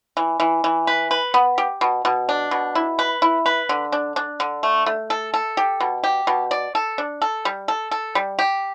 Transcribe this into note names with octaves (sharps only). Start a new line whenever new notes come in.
E3
E3
E3
B4
B4
B3
G4
B2
B2
D4
B2
E4
B4
E4
B4
D3
D4
D4
D3
A3
A3
A4
A4
G4
B2
G4
B2
D5
A4
D4
A4
G3
A4
A4
G3
G4